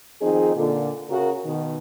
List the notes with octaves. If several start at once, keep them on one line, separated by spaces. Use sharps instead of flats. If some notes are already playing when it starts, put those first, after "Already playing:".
D#3 F3 C4 D#4 G#4
A#2 D3
C#3 F#4 A#4
B2 D#3